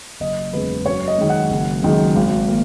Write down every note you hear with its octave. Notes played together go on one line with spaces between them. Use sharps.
F#1 D#5
E2 C#3 G#3 B4
F#2 C#5
D#5
D#3 G#3
F#5
F#1
F#2 D#3 G#3
G#1
A#3